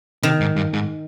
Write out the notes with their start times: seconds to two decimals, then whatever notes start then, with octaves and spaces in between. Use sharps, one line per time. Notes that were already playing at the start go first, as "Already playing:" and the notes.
0.23 C3 D#3
0.40 G#2
0.56 G2
0.73 G#2